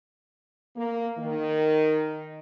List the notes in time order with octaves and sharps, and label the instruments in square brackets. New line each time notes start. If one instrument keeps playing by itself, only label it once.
[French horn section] A#3
D#3